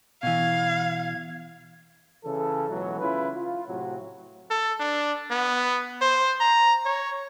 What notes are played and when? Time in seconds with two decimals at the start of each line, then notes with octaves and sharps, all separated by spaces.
0.23 B2 E3 F5 G#6
2.25 C#3 E3 A4
2.69 C#2 B2 E3 F#3
3.00 C#3 C#4 E4 F4 B4
3.35 F4
3.67 A2 C3 F#3
4.50 A4
4.80 D4
5.31 B3
6.01 C5
6.41 A#5
6.85 C#5